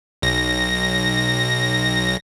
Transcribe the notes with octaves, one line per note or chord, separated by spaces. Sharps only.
B1 A#6